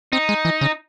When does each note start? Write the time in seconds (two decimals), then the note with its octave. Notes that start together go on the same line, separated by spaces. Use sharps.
0.12 C4 D#4
0.29 G#3
0.45 E3
0.61 C#3